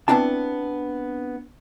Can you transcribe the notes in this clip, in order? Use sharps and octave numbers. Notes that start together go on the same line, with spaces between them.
B3 C4 D4 E4 A5